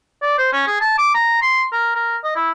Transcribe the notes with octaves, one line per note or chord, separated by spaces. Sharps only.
D5
C5
C#4
G#4
A5
D6
A#5
C6
A#4
A#4
D#5
E4